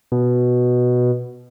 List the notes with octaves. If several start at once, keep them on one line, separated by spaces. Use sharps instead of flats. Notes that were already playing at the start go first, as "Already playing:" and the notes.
B2